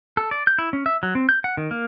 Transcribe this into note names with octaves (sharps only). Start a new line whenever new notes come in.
A4
D5
G6
E4
C#4
E5
F#3
C4
G6
F#5
D#3
A#3